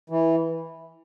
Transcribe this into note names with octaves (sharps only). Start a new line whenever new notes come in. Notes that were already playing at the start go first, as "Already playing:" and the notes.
E3